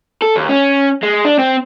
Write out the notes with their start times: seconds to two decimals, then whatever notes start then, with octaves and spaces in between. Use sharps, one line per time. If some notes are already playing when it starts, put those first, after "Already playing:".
0.22 A4
0.36 D#2
0.49 C#4
1.03 G#3
1.25 D4
1.39 C4